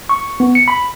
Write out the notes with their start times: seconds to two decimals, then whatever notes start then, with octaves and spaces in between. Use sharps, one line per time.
0.09 C#6
0.40 B3
0.55 C#7
0.68 B5